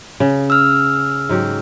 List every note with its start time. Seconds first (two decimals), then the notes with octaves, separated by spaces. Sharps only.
0.20 C#3
0.50 E6 F6
1.29 G#2 F#3 G4